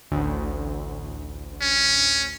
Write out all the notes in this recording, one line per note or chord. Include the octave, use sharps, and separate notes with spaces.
A1 D2
C#4